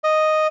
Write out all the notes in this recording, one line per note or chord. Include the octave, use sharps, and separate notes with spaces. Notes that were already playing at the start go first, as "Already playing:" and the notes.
D#5